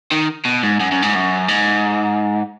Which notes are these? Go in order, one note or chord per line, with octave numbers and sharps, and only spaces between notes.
D#3
B2
G#2
F#2
F#2
G#2
F#2
G#2